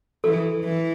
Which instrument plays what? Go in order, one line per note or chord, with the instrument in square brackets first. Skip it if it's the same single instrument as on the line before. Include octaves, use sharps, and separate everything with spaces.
[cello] E3 [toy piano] A4
[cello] E3